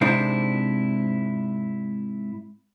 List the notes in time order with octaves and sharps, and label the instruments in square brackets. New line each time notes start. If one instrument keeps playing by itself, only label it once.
[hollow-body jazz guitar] G#2 C3 C4 D4 E4